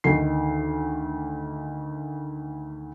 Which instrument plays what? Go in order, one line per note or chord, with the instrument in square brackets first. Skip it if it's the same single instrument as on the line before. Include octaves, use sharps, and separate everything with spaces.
[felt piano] D2 D#3 C7